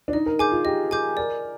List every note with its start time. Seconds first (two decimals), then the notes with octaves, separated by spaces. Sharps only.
0.08 D4
0.13 D#4 D#5
0.26 A#4
0.39 G#4 G#5 D6 G6
0.52 F4
0.65 G4 D#5
0.91 G#4 G#5 D6 G6
1.17 A#4 D5